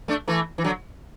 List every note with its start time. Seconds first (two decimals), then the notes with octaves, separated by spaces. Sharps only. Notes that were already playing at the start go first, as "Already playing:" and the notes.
0.08 A3 D4
0.28 E3 A3
0.58 E3
0.64 D3 F#3